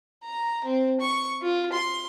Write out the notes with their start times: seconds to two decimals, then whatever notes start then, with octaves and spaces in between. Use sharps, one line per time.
0.24 A#5
0.65 C4
1.01 C#6
1.42 F4
1.72 C6